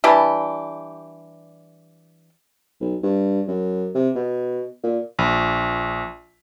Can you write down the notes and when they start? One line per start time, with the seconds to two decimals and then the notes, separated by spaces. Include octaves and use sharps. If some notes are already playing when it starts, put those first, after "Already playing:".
0.04 E3 G3 D4 G4
2.80 B1
3.03 G2
3.48 F#2
3.95 C3
4.15 B2
4.83 A#2
5.19 A#1